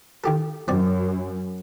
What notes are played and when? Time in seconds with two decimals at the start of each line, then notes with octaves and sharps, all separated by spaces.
0.24 D#3 G4 A4
0.68 F#2 C4 D5